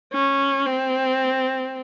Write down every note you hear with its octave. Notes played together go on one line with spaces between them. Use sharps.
C#4
C4